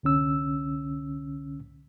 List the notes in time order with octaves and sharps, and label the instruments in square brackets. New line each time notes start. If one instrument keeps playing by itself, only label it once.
[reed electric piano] C2 D3 C#4 E6